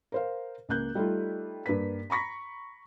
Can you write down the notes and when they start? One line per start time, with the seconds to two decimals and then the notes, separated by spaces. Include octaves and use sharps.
0.12 A#4 C5 F5
0.69 C#2 A#3 F#6 G6
0.95 G3 A3 D#4 F4
1.66 G2 A#3 B4 B6
2.10 A#5 B5 C#6 A#6 B6